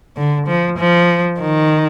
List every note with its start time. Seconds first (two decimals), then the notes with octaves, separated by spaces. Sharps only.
0.17 D3
0.47 F3
0.78 F3
1.40 D#3